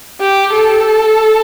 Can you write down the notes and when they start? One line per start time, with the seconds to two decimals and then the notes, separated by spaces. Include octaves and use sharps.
0.20 G4
0.53 A4